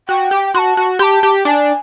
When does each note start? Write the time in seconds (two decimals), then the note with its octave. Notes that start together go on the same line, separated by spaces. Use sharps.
0.09 F#4 G5
0.31 G4
0.54 F#4 A5 C6
0.77 F#4
0.99 G4 C6
1.03 A5
1.23 G4
1.45 D4 G#5